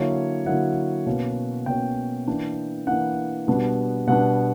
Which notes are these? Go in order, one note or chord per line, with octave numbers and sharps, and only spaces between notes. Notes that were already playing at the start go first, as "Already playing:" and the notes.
Already playing: D3 F#3 A#3 E4 C#5
D3 F#3 A#3 E4 F#5
B2 A#3 C#4
B2 A#3 C#4 G5
E3 A#3 D4
E3 A#3 D4 F#5
B2 G3 B3 D4
B2 G3 B3 D4 F#5